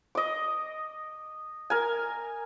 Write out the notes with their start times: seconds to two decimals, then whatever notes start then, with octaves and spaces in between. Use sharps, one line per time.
0.15 D#5 D6
1.70 A#4 G#5